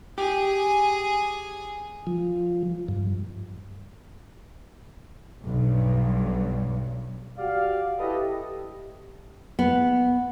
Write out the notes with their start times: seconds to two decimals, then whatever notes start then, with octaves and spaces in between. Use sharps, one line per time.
0.18 G4 G#4 G#5
2.07 F3
2.88 G2
5.44 B1 G2
7.38 F#4 G4 D5 F5
7.98 E4 G4 A4 B4 D#5
9.59 B3